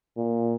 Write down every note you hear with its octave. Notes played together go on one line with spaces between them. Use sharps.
A#2